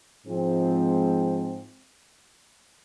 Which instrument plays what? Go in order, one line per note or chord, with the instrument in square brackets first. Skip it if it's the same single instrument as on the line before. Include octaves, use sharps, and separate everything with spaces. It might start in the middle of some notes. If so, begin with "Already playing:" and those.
[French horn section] G#2 F3 G#3 C4